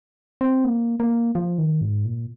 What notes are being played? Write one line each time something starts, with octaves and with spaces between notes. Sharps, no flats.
C4
A#3
A#3
F3
D#3
G#2
A#2